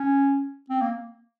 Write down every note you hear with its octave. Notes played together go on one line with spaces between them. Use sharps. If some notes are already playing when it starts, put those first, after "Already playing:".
Already playing: C#4
C4
A#3